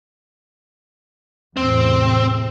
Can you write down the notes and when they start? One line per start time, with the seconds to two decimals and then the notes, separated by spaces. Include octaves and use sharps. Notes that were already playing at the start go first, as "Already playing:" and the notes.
1.57 E2 A2 C3 C4